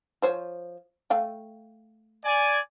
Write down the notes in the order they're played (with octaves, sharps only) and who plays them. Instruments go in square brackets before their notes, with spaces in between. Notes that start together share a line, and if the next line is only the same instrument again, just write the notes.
[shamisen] F3 C5 C#5
A3 F5 G5
[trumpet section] D5 G#5